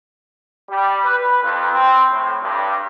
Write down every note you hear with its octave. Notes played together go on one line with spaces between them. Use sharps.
G3
B4
F2
C4
A2
G2